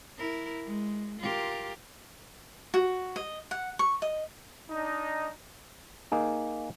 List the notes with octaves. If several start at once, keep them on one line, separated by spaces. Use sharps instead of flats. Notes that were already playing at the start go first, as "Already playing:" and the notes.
E4 A#4
G#3
F4 G4 A#4
F#4
D#5
F#5
C#6
D#5
D4 D#4
A#3 D#4 G#4